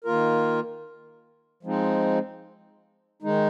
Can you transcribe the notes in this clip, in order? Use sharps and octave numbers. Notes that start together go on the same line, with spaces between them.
D#3 A#3 F4 A#4
F3 G#3 C4 D#4
D#3 G#3 D#4